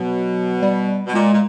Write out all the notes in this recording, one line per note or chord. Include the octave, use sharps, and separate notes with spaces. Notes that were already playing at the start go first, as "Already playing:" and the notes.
Already playing: B2 F#3
G3
B2
A#2 G#3
A#2